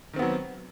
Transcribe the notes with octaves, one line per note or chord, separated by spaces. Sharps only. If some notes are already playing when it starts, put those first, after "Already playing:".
D#3 F#3 B3 C4